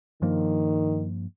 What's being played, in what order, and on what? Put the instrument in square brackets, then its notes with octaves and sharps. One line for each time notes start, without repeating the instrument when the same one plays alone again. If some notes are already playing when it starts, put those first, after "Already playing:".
[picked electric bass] G2 F3 A#3 [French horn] D#3